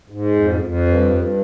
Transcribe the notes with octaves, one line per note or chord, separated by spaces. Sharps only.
G#2
F2
F2
G2
G2